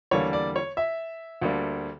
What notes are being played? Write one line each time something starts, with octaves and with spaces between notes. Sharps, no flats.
E2 D3 G3 A#3 C#5
D5
C#5
E5
D2 D3 G3 A#3